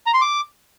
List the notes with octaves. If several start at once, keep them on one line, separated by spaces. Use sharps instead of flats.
A#5
C6
D6